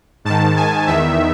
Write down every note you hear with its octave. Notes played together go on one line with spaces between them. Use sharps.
G#2 D#3 A5
G#5
E2 D#3 E5